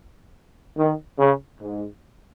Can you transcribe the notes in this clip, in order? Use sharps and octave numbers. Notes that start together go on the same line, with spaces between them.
D#3
C#3
G#2